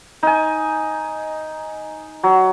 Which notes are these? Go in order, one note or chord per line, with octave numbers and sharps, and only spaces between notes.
D#4 G#5
F#3